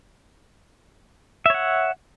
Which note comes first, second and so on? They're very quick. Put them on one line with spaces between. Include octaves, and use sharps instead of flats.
E5 C#5 F#5